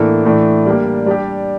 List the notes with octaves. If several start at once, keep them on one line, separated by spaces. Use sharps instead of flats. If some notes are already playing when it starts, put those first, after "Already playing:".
Already playing: A2 E3 A#3 D4 A4
A2 E3 A3 D4
G3 A#3 D4 G4
G3 D4 G4